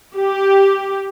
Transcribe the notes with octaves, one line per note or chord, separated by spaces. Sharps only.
G4